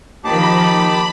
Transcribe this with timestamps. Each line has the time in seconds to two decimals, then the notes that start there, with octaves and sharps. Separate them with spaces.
0.24 D#3 F3 A#3 D#4 G4 A5 B5 D6